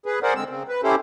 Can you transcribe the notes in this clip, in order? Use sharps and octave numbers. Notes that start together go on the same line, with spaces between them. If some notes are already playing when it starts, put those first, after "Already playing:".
G#4 B4
G#4 A#4 C5 D5 F#5
D3 G#3 C4 E6
C#3 C4
B4
C#4 E4 G4 A4 C5